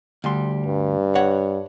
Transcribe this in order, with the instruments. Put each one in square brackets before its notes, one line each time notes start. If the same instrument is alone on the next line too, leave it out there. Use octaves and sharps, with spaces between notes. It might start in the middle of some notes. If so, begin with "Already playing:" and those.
[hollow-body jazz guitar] D2 G3 C6
[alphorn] G2
[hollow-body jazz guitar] C#5 F#5